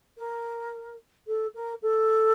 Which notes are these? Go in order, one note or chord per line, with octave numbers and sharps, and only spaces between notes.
A#4
A4
A#4
A4